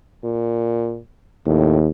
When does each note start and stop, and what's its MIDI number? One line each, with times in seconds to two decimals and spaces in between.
0.24 0.99 46
1.46 1.87 39
1.46 1.78 45